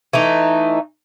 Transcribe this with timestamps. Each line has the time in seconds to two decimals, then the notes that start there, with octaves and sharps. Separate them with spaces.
0.13 E3 A3 D#4